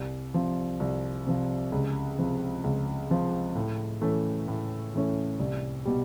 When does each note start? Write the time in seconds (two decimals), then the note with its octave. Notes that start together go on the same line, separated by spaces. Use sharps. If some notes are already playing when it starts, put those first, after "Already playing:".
Already playing: C2
0.34 C3 F3
0.80 C2
1.26 C3 F3
1.72 C#2
2.18 C3 F3
2.64 C#2
3.10 C3 F3
3.55 A2
4.01 E3 A3 C#4
4.48 A2
4.94 E3 A3 C#4
5.39 C2
5.85 B2 G3